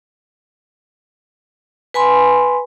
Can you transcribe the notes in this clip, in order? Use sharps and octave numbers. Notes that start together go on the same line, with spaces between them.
B4 G#5 B5 C6